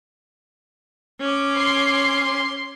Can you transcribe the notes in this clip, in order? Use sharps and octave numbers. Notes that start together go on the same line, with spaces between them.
C#4 D6
C6 C7